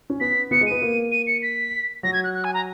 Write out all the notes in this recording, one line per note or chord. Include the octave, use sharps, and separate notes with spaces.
C#4
B3 B6
B3 C#7
G#3
B3 D#7
A#3
D#7
C#7
B6
F#3 A#6
G#6
F#6
F#6
G#5
A#5